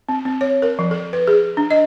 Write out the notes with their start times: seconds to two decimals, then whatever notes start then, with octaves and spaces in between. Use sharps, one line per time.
0.09 C4
0.25 C4
0.41 C#5
0.62 A#4
0.79 F3
0.91 A4
1.13 B4
1.27 G#4
1.57 D4
1.71 D#5